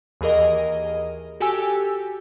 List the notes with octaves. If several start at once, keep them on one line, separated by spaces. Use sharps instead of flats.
D#2 E3 G#4 A#4 D#5
F#4 G4 A4 G#5 E6